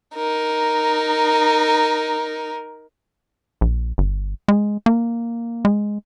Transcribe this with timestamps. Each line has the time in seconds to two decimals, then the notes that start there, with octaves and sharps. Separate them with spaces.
0.16 D#4 A#4
3.61 A#1
3.98 G1
4.48 G#3
4.86 A#3
5.65 G#3